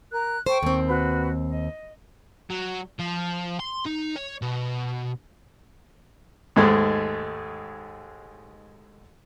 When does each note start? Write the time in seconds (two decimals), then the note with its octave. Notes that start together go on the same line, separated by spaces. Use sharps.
0.10 A#4 F#6
0.46 A4 C5 G5 C#6
0.63 D#2 C4
0.85 F#4 B4
1.47 D#5
2.50 F#3
2.99 F3
3.60 C6
3.86 D#4
4.16 C#5
4.42 B2
6.56 D#2 G#2 G#3 A3